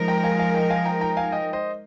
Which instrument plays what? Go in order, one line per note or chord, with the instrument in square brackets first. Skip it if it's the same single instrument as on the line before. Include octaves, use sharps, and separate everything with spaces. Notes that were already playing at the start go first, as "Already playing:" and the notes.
Already playing: [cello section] F3 G#3 D#4 A#4
[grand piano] G5 A#5
F5 G#5
F5 G#5
D#5 G5
F5 G#5
G5 A#5
G5 A#5
F5 G#5
D#5 G5
C5 D#5